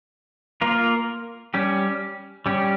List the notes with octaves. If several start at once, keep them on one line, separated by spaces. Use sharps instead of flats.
A#3 F4 A#4
G3 C#4 G4
G3 C#4 G4